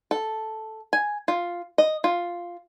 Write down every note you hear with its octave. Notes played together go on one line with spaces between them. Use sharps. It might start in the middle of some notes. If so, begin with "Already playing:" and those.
A4
G#5
F4
D#5
F4